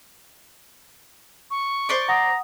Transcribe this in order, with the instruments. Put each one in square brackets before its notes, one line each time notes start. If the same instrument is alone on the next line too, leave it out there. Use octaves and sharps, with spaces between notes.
[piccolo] C#6
[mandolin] C5 D5 D6
[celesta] F#5 D#6 [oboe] A#5